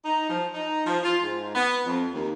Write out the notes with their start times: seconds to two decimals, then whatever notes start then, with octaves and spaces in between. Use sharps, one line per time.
0.05 D#4
0.30 F3
0.54 D#4
0.86 F3
1.04 F4
1.23 G#2
1.55 B3
1.86 F2
2.14 D#2